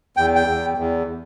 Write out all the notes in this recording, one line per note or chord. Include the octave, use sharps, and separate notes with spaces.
E2 G5
G5
E2
E2